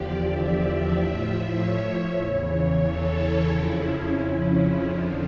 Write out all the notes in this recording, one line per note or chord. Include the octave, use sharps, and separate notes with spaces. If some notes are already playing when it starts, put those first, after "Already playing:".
Already playing: E2 D3 F3 G4 D5
E5
A2 F3
E5
C#5
C#5
E2 C#3 E3
C#5
A4
F2 C#3 F3 E4
C#4
C#4
C#4
F2 D3 F3